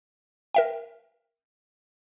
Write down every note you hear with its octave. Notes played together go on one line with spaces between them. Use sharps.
A#4 E5 G5